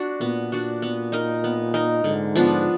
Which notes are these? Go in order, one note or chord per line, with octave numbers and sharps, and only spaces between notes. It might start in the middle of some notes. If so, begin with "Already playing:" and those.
Already playing: D4 F#4
A#2 B3
D4 F#4
B3
D#4 A#4 D#5
B3
D#4 A#4 D#5
G#2 D3
F3 B3 D4